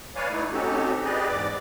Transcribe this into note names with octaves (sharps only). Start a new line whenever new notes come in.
B4 C#5 D5 F5 G#5
A2 A3 D#4 E4
C4 C#4 D#4 F#4 G4 A4
G4 G#4 B4 D5 D#5
E2 G#2 D5 D6